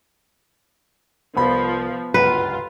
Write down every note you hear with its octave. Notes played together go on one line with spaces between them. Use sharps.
C2 F3 B3 B5
G1 C#2 F#2 F4 B4